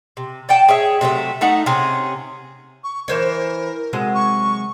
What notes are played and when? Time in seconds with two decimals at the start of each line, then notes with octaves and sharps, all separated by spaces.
0.17 C3
0.49 D5 F#5 G5 A5
0.69 G#4 C#5 E5
1.01 C3 F#3 A3 E5
1.41 A3 D#4 E5 F#5
1.66 C3 C#4 G#4
2.84 C#6
3.08 E3 A#4 C5 C#5
3.93 C3 F#3 G#3
4.15 C#6